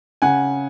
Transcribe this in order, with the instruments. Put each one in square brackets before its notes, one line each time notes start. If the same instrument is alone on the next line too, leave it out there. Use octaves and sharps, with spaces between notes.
[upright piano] C#3 F#5 G#5